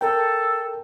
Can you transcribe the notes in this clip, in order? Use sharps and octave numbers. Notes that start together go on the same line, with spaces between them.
A4 A#4 G5